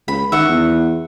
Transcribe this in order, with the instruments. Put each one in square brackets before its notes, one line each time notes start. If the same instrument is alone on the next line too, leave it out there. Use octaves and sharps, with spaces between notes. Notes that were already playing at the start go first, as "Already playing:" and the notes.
[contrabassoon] C#2 [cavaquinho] B5
[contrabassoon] D#3 [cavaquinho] E5 F#5 C#6
[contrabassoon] E2